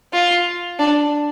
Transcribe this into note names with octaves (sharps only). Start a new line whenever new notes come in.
F4
D4